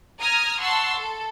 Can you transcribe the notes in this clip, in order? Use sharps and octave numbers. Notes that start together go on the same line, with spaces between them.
A#5 D#6 F6 G#6 A#6
F#5 A5 C6 C#6 E6
A4